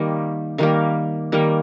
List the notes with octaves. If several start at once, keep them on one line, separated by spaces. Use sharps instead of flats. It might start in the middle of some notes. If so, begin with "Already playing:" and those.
Already playing: D#3 G3 A#3
D#3 G3 A#3 F5
D#3 G3 A#3